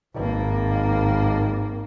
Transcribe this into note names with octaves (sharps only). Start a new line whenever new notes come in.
G#1 A#3